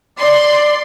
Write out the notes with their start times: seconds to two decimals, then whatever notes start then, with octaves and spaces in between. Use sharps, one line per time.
0.19 D5 C6